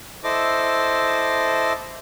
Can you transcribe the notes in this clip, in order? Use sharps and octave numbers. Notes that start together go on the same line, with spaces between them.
E4 A4 C5 D#5 D6